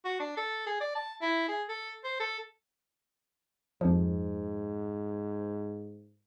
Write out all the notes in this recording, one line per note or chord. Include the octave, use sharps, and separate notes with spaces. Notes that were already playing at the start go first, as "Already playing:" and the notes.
F#4
D4
A4
G#4
D5
A5
E4
G#4
A4
C5
A4
F2 G#2 F3